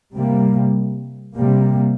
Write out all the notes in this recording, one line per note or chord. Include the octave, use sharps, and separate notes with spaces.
C3 G3 A#3
C3 G3 A#3